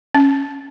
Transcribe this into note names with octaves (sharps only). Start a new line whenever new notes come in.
C#4